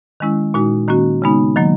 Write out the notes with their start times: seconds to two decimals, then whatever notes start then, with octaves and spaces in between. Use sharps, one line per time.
0.20 D#3 G#3 C#4 E4
0.54 A#2 G#3 D#4 F#4
0.88 D#3 A#3 C#4 F#4
1.22 C#3 G#3 B3 D#4
1.56 D#3 F#3 A#3